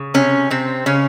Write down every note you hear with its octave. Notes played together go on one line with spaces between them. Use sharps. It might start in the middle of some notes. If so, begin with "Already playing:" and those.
Already playing: C#3
C3 C#4
C3 C4
C#3 C#4